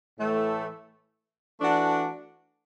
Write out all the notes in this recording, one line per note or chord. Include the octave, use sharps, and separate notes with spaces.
A2 E3 A3
E3 A3 D4 F#4